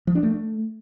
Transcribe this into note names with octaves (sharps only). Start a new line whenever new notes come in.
F3
D4
A3